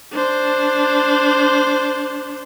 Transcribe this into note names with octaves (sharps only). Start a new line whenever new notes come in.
D4 C5